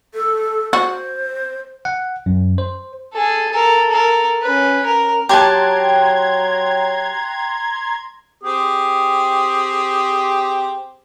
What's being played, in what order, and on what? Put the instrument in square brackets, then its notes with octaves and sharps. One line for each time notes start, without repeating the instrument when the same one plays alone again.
[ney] A4
[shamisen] F#4 [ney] C5
[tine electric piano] F#5
F#2
C5
[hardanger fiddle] G#4 A4
A4 A#4
A4 A#4
C#4 B4
A#4
[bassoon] F#3 [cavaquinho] G4 A5 [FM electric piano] G5 F#6 [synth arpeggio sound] A#5 C6 G#6
[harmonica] C4 G4 G#4